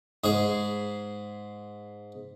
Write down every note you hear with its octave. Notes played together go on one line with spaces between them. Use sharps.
G#2 G#4